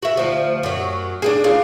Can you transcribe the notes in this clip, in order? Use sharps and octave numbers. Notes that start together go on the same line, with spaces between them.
F#4 E5
D2 F3
F#2 F#3
D4 E4 G#4
D4 F4